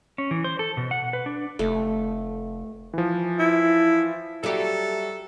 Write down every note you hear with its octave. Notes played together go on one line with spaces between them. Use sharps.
C#4
E3
C5
A4
B2
F#5
B4
D4
F1 A3
E3 F3
E4
F#3 G3 F#4 G4 A4 E5 A#5